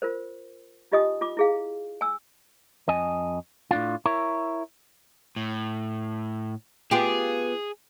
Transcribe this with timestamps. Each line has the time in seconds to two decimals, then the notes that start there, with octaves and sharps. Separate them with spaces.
0.02 F4 A#4 C5
0.92 D#4 F4 G4 D#5 G#5 D#6
1.21 F4 D6
1.37 E4 G#4 F5
2.01 G#5 E6
2.88 F2 D#5 G#5
3.71 A2 D4 F4
4.06 E4 A#4 C#5
5.36 A2
6.91 B3 F4 G4 G#4